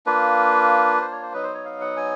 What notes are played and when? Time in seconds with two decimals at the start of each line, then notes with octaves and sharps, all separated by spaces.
0.06 A#3 D4 F4 B4
1.01 C5
1.12 C#5
1.22 C5
1.33 F#3 B3 D#4 B4
1.43 C5
1.54 C#5
1.65 F5
1.81 F#5
1.97 G#5